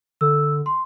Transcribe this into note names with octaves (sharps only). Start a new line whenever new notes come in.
D3 E6
C6